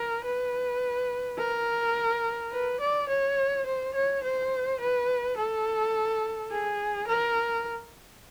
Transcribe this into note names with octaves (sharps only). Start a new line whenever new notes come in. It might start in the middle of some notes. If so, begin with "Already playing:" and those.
Already playing: A#4
B4
A#4
B4
D5
C#5
C5
C#5
C5
B4
A4
G#4
A#4